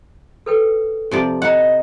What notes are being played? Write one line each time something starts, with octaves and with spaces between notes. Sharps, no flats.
A4 B4 G5
C3 F3 D5
D#5 F#5 G5 A#5